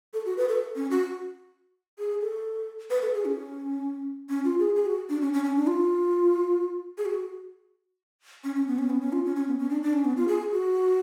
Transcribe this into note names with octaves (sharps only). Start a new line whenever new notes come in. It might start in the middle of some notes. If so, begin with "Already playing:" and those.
A4
F#4
B4
A4
C#4
F#4
G#4
A4
B4
A4
G#4
C#4
C#4
F4
G#4
G#4
F#4
D4
C#4
C#4
C#4
D4
F4
G#4
F#4
C#4
C#4
B3
C#4
B3
C#4
F4
C#4
C#4
B3
C#4
D4
D4
C#4
B3
F4
G#4
F#4